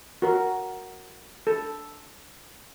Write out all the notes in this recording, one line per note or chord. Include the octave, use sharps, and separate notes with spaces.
F#4 A#4
A4